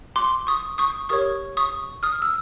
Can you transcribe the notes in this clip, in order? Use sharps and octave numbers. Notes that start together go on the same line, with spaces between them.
C6 D6
C#6 D#6
C#6 D#6
G4 A#4 C#5 C#6 D#6
C#6 D#6
D#6 F6
E6